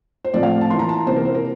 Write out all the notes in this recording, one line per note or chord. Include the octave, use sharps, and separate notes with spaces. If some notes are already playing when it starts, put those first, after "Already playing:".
C5
A2 F3 A3 C4 D5
F5
A5
E3 A#3 C6
A#5
A5
C3 E3 A#3 C5
A#4
C5
A#4